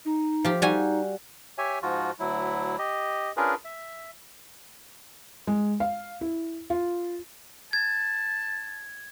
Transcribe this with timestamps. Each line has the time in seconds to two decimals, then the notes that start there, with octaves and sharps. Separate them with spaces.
0.05 D#4
0.45 F3 G4
0.62 G3 D#4 F#4 G#5
1.58 G4 C#5 E5 G#5
1.82 G#2 F3 F4 F#4
2.19 D2 F#3 E4
2.79 G4 D#5
3.37 C#4 D4 F4 G#4 A#4 B4
3.65 E5
5.47 G#3
5.80 F5
6.21 E4
6.70 F4
7.73 A5 G#6